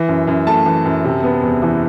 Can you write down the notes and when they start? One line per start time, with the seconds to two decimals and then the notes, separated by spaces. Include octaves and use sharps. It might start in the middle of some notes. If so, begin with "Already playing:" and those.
Already playing: E3
0.08 F#2
0.27 F#2
0.47 A3 A5
0.66 E3
0.85 F#2
1.05 C3
1.23 B3
1.43 E2
1.62 E3